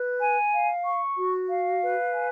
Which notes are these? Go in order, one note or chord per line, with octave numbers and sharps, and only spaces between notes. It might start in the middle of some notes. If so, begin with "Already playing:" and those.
Already playing: B4
G#5
F5
C#6
F#4
F5
B4
G#5